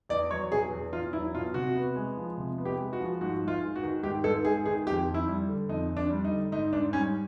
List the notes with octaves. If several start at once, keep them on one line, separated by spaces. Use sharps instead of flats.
E2 D5
F#3 C#5
B2 G#4
E2
E2 F4
F#3 E4
B2 F4
C3 F#4
B3
G#3
F3
C3
B3
G4
G#3
F#4
F3
G#2 F#4
G#2
F4
G#3
F#4
D#3
G#2 G4
G#2 A4
G#3 G#4
D#3 G#4
F2 G4
F2
E4
G3
D3
F2 D#4
F2
D4
G3
D#4
D3
G#2 D#4
G#2 D4
G3 C#4